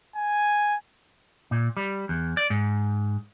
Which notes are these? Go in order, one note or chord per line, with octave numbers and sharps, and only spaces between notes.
G#5
A#2
G3
E2
D5
G#2